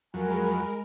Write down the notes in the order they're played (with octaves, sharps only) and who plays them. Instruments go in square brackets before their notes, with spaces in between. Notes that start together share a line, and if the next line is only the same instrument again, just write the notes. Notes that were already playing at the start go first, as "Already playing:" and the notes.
[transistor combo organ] F2 F#3 [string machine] G#3 A#4 [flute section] G#5 B5